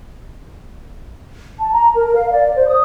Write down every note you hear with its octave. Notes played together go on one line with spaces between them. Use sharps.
A5
A#5
A#4
F5
D5
C5
D#6